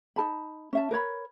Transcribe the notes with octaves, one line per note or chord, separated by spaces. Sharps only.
D#4 A#4 A5 B5
C#4 E5 A5
A#4 B4 C#5 B5